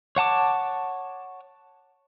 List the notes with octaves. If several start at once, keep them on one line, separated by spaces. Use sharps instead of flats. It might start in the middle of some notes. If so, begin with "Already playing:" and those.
C#5 F#5 A5 D6